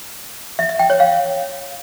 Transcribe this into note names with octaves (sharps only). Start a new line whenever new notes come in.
E5
E5
G5
C#5
F5